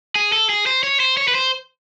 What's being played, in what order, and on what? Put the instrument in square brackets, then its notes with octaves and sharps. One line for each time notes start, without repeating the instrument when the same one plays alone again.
[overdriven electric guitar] G#4
A4
G#4
C5
C#5
C5
C#5
B4
C5